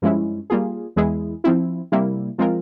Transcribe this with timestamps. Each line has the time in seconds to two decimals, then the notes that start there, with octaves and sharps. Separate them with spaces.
0.02 G2 F3 G#3 C#4 E4
0.50 G3 A#3 F4 G#4
0.96 E2 E3 G#3 E4 G#4
1.44 F3 C4 E4
1.92 C3 G3 A#3 E4
2.38 F3 G#3 C4 F4 A#4